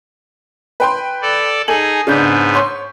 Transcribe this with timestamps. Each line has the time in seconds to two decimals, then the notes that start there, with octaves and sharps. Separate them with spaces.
0.80 B4 G5 C6
1.22 A4 D5
1.68 D#4 G#4 A4 G#5 F#7
2.07 G#2 C#3 B3 D4 G6
2.54 C#5 C6